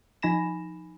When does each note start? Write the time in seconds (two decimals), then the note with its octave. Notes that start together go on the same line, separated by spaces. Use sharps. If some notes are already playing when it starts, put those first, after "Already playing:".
0.22 F3 D#4 G#5 B5 A#6 E7